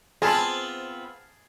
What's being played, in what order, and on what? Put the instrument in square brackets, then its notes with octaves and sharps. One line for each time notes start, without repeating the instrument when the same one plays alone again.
[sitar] B3 C4 F4 [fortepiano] G#4 A5 B5